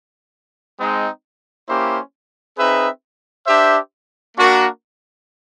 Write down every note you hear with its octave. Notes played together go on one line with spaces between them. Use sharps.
G#3 C4 D#4
A#3 C#4 E4 G4 C5
C4 D#4 G#4 B4 E5
D4 G4 C5 E5
A#3 D4 F#4 A#4